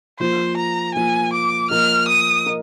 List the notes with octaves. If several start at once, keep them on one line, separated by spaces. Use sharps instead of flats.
F3 A#3 F4 C5
A#5
F3 A#3 F4 G#5
D6
F3 A#3 F4 A#4 D#5 F6
D#6
A#4 D#5